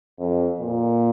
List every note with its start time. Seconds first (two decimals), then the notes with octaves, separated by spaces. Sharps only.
0.19 F2
0.60 A#2